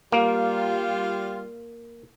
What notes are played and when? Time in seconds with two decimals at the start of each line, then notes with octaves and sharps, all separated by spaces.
0.12 G3 A#3 F4